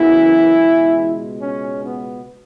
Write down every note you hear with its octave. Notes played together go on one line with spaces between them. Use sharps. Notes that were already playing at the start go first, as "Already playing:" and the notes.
Already playing: F#2 C#3 E3 F#3 B3 E4
C#2 B2 G#3
C#4
B3